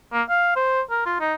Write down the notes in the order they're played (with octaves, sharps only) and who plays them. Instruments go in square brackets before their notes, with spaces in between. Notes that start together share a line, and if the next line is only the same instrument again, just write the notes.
[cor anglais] A#3
F5
C5
A#4
F4
D#4